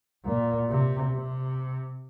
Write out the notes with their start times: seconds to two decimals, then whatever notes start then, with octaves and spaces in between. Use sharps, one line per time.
0.25 A#2
0.69 C3
1.14 C3